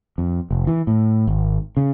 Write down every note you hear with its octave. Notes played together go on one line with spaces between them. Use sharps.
F2
F1
E3
A2
G#1
C#3